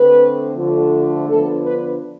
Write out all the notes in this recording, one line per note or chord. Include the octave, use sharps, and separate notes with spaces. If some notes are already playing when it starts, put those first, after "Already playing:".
Already playing: D3 A3 C4 B4
D3 F3 A3
D3 F3 B3 D4 A4
B4